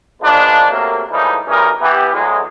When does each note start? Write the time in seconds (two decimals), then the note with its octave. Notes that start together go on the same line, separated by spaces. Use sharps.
0.21 F3 G#3 A#3 B3 D4
0.70 C3 F#3 A3 A#3
1.11 A2 E3 F3 G3 G#3 D#4
1.47 B1 E3 G3 C#4 D#4 A#4
1.80 E3 B3 G4
2.13 E2 A2 F#3 G#3